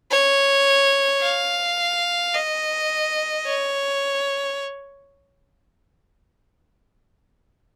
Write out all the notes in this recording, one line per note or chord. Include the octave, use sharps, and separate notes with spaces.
C#5
F5
D#5
C#5